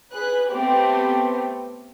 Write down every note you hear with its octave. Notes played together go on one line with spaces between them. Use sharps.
G#4 B4 F#6
A3 B3 C4 G4